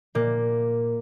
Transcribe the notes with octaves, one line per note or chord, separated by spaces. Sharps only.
A#2 A#3